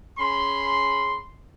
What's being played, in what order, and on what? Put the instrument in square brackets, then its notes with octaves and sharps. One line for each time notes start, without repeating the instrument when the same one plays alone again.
[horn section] C#4 G#4 B5 C6